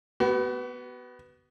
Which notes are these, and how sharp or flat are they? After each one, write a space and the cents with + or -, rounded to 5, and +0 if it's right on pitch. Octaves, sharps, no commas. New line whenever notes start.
B3 +0 F#4 +40